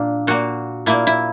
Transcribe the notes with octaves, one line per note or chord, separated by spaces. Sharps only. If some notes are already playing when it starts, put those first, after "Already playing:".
Already playing: A#2 A#3 D4
A#2 A#3 F#4
A#2 A#3 E4
E4